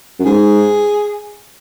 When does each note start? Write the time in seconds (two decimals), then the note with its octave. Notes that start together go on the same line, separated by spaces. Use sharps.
0.19 F#2
0.25 G#2 G#4